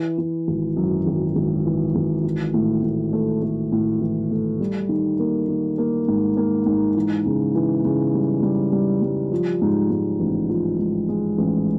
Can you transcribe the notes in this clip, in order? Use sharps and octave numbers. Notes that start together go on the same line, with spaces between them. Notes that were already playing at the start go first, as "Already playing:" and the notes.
Already playing: E3
E3
G#1
F#2
G#1
G#1
E3
G#1
E3
A2
A2
A3
A3
A2
E3
A3
G3
D#3
A#3
D#3
A#3
G#2
A#3
G#2
E3
C#3
E3
C#3
G3
G3
G3
G3
F3
G#2
G#2
A1
F3
G#2
G#3
A1